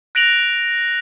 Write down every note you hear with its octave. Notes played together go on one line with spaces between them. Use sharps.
F#6 A#6 D7 F7 F#7